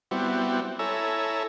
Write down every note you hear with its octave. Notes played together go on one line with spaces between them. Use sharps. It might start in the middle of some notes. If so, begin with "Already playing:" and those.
G3 B3 C4 E4 F#4
E4 A4 C#5 G#5 A#5 E6